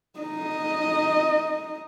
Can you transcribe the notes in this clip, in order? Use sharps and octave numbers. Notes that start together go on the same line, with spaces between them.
D#4 D#5